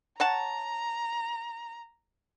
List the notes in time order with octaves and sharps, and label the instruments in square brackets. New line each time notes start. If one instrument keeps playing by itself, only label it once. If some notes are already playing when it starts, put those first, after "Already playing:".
[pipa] C#5 F#5 A5 [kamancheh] A#5